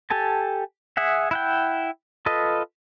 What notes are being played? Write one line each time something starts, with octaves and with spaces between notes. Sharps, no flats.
G4 A4 G#5 A5
G#4 E5 F#5
E4 F#5 G5
F4 A4 B4 D#5